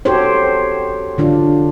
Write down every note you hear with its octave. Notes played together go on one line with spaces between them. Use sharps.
F#4 G4 A4 C5 C#5
D3 D4 F4